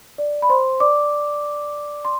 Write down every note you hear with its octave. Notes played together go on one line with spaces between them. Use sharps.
D5
B5
C5 C6
D5 D6
C6